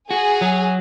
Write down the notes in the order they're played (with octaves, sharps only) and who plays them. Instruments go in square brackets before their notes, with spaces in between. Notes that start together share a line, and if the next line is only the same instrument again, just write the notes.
[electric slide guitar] F#4 [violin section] G#4
[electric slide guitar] F#3